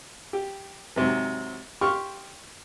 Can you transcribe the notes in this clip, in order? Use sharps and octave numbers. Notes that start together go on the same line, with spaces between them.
G4
G#2 C3 F#3
G4 C6 C#6 F6